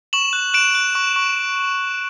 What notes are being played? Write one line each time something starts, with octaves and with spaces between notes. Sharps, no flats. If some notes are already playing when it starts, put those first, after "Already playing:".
C#6 E7 F#7
F#6
F#6 D7 E7
F#6
C#6
C#6